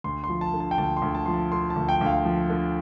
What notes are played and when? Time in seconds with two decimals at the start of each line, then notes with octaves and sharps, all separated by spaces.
0.04 D2 C6
0.24 C6
0.29 F3
0.41 A5
0.53 D3
0.60 A5
0.71 G5
0.78 D2 A5
0.97 C6
1.02 D2
1.15 A5
1.26 F3 C6
1.34 A5
1.52 D3 C6
1.70 A5
1.76 D2
1.89 G5
2.01 D2 F5
2.25 F3
2.50 D3